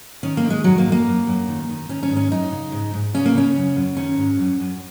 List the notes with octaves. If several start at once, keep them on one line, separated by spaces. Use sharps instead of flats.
D#3 C#4
A#3
D#3
G#3
F#2 F#3
A#3
F#2
A#3
F#2
F#2
D#3
D#3
D#3 C#4
C#4
G#2
C#4
F#2 D#4
C#3
G#2
G#2
C#3 C#4
A#3
C#3 C#4
F#2
F#2
D#3 C#4
G#2
F#2
F#2